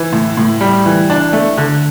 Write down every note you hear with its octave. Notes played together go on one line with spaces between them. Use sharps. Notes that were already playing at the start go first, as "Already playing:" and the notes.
Already playing: E3
A2
A2
G3
E3
D4
A3
D3